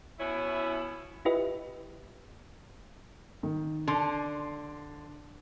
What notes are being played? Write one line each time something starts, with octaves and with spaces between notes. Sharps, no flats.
B2 C#4 E4
E4 F4 G4 B4 D#5 E5
D#3
D3 C6